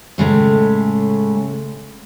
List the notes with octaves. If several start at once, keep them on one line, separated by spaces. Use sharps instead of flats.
A2 C#3 G#3 A3